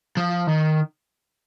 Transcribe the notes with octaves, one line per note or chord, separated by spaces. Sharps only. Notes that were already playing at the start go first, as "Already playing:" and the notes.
F3
D#3